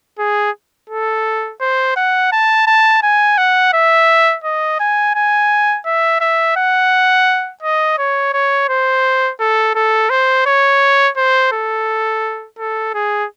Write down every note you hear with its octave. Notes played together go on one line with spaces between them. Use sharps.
G#4
A4
C5
F#5
A5
A5
G#5
F#5
E5
D#5
G#5
G#5
E5
E5
F#5
D#5
C#5
C#5
C5
A4
A4
C5
C#5
C5
A4
A4
G#4